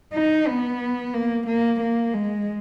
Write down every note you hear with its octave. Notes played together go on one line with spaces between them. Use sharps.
D#4
B3
A#3
A#3
A#3
G#3